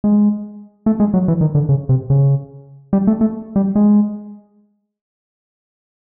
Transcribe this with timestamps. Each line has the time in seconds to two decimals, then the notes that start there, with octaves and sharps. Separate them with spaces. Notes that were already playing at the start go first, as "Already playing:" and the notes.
0.04 G#3
0.86 A3
1.00 G#3
1.14 F#3
1.28 E3
1.41 D#3
1.55 D3
1.69 C#3
1.89 C3
2.10 C#3
2.93 G3
3.07 A3
3.21 A3
3.56 G3
3.76 G#3